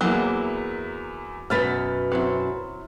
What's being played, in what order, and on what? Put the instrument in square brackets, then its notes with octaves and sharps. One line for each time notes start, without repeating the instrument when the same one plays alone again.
[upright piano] E2 E4 [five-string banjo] F#3 A#3
[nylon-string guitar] F#2 B2 B3 [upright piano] F6 A6 B6
[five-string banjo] F#3 C4 E4